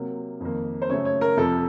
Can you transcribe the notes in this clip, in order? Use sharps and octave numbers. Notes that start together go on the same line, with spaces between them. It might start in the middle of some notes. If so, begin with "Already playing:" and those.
Already playing: C3 F#3 A#3
F2 D#3 A#3
C5
F#2 C#3 A3 C#5
C#5
A#4
F2 C3 F3 A4